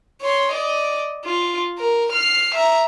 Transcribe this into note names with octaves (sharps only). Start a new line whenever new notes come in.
C#5 C6
D5 D#5
F4
A#4
F6 C7
E5 A#5